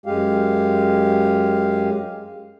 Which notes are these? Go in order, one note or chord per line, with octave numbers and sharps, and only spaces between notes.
F#2 G#3 G4 F5